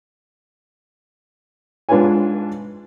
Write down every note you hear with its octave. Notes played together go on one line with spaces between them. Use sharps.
G#2 D4 F4 B4 C#5 G#5